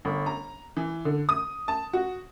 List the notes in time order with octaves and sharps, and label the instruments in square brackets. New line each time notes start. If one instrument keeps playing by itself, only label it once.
[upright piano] G1
A#5
E3
D3
D#6
A5
F#4